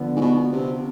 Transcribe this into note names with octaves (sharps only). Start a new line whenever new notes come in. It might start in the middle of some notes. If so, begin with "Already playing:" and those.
Already playing: D3 F3 B3
G#2
B2
C3